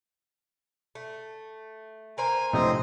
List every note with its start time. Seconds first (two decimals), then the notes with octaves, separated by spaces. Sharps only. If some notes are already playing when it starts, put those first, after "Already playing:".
0.95 A3
2.18 A#3 C5 G#5 A#5
2.53 A#1 A2 C3 C4 D#5